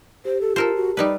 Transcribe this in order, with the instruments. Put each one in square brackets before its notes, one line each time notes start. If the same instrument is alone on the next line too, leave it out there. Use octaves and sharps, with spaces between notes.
[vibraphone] G4 [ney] C5
[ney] A4
[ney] F4 [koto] A4 A#4 C5
[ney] F#4
[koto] G3 D#4 B4 [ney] D5